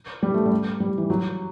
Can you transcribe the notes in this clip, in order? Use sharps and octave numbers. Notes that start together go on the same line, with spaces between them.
G3
A3
G3
G3
E3
F#3